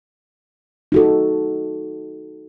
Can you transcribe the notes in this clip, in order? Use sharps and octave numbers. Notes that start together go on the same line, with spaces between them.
D#4 F#4 A4